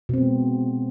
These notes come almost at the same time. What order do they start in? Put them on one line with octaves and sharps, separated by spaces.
B2 C4 B3 G#3